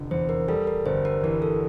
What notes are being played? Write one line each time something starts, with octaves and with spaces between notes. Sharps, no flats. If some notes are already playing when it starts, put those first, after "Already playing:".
Already playing: F1 D3 F3
E2 C5
A#4
G3 A4
A#4
G1 C5
A#4
E3 A#4
A4